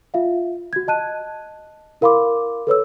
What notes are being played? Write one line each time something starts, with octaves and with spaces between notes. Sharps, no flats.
F4 E5 F5
F#4 G#6
D#5 A5 F#6 D#7
E4 A#4 F5 B5 C6 D6
A4 B4 C#5 E6